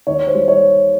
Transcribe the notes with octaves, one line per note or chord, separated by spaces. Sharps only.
D#2 C#5
C5
G3
C#5